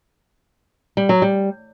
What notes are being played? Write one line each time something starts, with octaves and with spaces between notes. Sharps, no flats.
G3
F#3
G3